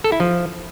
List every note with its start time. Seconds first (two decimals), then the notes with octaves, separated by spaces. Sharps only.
0.04 A4
0.12 E4
0.20 F3